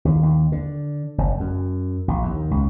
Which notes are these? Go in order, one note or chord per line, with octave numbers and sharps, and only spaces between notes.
D#2
D#2
D3
F#1
F#2
A#1
D#2
C#2